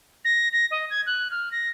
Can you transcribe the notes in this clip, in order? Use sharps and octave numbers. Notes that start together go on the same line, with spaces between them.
A#6
A#6
D#5
G#6
F#6
F6
A#6